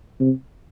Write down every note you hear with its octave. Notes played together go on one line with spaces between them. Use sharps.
C3